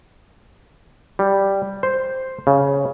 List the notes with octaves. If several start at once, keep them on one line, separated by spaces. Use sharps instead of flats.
G3
C5
C#3